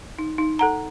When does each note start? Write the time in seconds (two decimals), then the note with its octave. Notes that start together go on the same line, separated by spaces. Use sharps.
0.19 D#4
0.38 D#4
0.59 A4 F#5 A#5